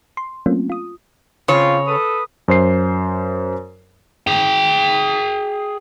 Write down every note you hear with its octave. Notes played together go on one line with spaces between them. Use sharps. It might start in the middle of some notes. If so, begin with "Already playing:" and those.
C6
F#3 A3 A#3 C4 C#4 F4
F4 D#6
C#3 C4 F4 C#5
A4 B4 D#6
F#2 C5 C7
G#4 G5